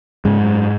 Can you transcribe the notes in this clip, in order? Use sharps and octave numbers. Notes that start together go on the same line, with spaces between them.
G#2 C#3 G#3
F#2